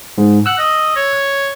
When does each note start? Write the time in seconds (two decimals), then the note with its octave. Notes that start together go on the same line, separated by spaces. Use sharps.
0.18 G#2
0.46 F#5 E6 F#6
0.58 D#5
0.96 C#5